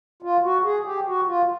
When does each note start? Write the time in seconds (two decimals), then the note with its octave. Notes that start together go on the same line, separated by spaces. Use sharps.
0.22 F4
0.43 F#4
0.64 G#4
0.85 G4
1.06 F#4
1.27 F4